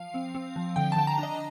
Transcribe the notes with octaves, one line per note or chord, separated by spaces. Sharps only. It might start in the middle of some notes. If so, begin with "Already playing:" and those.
Already playing: F3 F5
C4
C4
F3
D3 G5
D3 A5
A#5
D4
D#5